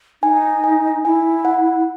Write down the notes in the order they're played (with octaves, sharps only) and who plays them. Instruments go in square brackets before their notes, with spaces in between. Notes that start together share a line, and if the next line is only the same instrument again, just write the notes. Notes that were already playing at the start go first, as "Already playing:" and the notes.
[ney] D#4 [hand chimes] G#5
[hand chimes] G#5
[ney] E4 [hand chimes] G#5
[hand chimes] F#5